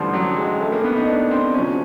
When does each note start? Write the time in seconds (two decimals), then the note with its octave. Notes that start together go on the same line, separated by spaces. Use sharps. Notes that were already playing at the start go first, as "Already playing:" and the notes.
Already playing: A1 G2 D3 F3 G3
0.13 F#3
0.37 G#3
0.61 A3
0.72 A#3
0.84 B3
0.96 D#4
1.08 D4
1.31 C4
1.54 D2 C3 F3 C#4